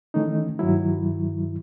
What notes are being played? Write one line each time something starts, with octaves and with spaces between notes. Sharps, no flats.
D#3 E3 A3 C#4 D#4
G2 D#3 F#3 E4